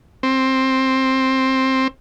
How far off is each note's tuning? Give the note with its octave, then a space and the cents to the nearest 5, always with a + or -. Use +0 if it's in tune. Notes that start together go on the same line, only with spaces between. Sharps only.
C4 +10